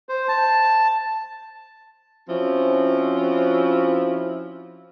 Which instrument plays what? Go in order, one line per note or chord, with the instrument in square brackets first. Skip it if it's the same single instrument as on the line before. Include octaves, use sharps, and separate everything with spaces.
[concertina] C5
A5
[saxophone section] F3 C4 C#4 E4 F#4